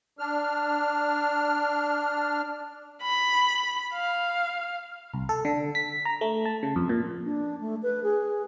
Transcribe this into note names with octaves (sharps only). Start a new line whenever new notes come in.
D4 F6
B5
F5
C2
A4
D3
B6
A#5
A3
A5
C#3
F2
A#2
D4
A3
B4
G#4